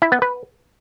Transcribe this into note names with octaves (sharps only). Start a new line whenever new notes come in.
E4
B3
B4